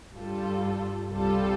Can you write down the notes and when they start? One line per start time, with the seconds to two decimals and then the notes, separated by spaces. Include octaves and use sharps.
0.15 G2 G3 F4 A4
1.09 C2 C3 G3 F4 A4